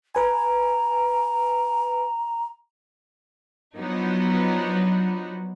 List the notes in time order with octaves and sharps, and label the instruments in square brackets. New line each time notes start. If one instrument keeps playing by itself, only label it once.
[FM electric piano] B4 G#5 [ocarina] A#5
[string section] F3 F#3 B3 D4 D#4 F#4